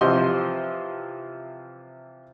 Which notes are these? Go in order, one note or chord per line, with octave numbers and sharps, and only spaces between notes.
C3 E3 F3 C5 D#5 C6